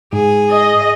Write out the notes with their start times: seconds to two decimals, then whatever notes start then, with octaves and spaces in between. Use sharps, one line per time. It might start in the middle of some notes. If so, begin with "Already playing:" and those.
0.13 G#2 G#4
0.52 D#5